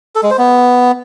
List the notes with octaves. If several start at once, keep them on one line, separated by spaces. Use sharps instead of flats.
A4
G#3
C5
B3